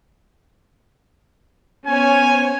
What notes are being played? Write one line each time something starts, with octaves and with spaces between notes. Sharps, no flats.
B3 C#4 C5 C#5 G#5